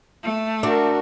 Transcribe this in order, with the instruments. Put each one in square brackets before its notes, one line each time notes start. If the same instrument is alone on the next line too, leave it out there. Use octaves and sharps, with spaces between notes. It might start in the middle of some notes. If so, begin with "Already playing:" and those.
[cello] A3
[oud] D4 [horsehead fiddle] F#4 A#4